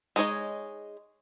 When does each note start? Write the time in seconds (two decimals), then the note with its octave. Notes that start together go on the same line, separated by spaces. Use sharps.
0.16 G#3 D#4 C#5 D#5